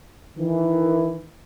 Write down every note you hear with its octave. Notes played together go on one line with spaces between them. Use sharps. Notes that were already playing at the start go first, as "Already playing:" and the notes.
D#3 E3